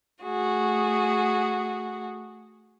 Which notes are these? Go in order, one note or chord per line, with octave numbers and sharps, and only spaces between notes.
A3 F#4 G#4